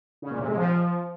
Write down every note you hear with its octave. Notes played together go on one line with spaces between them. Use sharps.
C#3
A#2
C3
G#3
F3